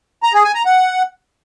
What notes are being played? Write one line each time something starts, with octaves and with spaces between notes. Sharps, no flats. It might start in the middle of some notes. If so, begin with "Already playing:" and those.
A#5
G#4
G#5
A#5
F#5